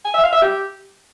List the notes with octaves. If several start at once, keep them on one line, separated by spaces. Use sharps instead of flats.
G#5
E5
F5
E5
G4